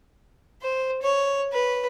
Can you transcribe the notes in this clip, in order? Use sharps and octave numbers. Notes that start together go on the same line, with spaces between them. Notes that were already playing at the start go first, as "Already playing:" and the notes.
C5
C#5
B4